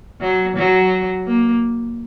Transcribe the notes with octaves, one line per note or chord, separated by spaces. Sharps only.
F#3
F#3
A#3